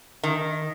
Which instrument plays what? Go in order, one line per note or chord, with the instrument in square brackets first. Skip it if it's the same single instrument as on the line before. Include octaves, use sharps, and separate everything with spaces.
[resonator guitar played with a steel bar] D#3